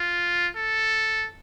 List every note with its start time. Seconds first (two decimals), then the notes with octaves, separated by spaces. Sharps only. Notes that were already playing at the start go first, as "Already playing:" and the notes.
Already playing: F4
0.57 A4